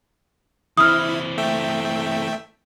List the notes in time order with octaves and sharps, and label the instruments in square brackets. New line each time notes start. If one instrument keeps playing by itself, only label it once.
[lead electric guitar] E3 C4 [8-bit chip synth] E4 [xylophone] D#6 F6
[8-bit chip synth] A3 E5 G5